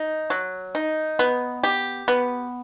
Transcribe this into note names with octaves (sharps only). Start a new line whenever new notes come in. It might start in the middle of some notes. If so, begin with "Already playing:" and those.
Already playing: D#4
F#3
D#4
B3
G4
B3